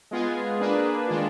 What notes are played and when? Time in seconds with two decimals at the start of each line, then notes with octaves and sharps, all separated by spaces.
0.11 G#3 B3 F4 G#4
0.60 A#3 D4 G#4 B4
1.08 D#3 G#3 D4 F4